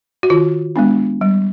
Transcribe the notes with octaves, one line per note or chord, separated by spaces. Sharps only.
F#4
D#3 F4
G#3 B3 D4
G3